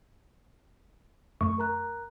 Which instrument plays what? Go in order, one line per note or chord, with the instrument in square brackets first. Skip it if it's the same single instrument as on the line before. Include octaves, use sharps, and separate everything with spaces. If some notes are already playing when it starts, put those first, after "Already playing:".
[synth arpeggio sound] F#2 A3 C#6
[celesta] A#4 A#5 F#6